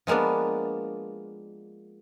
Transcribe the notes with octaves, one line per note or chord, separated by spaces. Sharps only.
F3 G#3 A#3 B3 D4